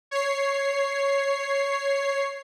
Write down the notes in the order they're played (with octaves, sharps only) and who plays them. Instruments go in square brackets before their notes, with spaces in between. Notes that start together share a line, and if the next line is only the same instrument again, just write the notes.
[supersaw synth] C#5 C7